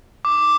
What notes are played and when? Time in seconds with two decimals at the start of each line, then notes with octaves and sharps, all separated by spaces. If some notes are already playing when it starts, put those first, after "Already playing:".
0.25 D6